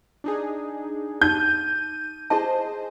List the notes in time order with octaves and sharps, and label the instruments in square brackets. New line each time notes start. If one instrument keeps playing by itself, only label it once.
[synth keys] D4 D#4 G#4
[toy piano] D#4 [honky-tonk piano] G6 [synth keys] D#7
[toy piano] E4 A5 [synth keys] G#4 C5 D#5